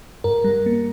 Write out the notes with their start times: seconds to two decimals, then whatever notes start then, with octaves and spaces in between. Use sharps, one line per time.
0.24 G2 A#4
0.44 G3
0.66 A#3